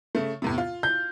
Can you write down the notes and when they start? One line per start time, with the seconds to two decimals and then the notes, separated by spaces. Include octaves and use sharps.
0.15 C#3 A3
0.42 E2 A2 C3
0.58 F4
0.83 G6